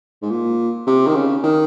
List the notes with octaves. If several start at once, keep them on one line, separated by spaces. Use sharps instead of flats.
G#2
A#2
C3
D#3
C#3
D#3